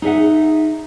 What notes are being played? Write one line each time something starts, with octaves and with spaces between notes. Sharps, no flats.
D#4 G#4 E5 F#5